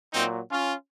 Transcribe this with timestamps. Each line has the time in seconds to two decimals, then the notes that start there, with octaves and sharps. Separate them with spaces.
0.13 A#2 F#3 C4 D#4
0.51 C#4 F4